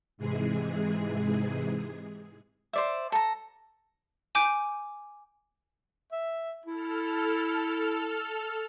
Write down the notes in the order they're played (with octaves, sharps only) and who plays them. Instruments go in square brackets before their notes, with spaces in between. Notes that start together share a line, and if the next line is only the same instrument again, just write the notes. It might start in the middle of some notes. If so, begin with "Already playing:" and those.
[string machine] G#2 C3 E3 G#3 G#4
[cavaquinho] C5 D5 E5
A4 A#5
[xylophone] G#5 D6 G6 D7
[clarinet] E5
[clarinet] E4 [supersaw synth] A4 F6